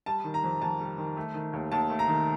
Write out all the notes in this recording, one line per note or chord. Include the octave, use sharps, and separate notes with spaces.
G3 A5
D#3
A#5
F2
F2 A5
G3
D#3
A3
D#3
D#2
D#2 A5
A3
A#5
D#3